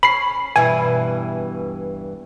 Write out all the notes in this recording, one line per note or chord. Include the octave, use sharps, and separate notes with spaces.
C#4 B5 C7
G2 B2 E3 G#5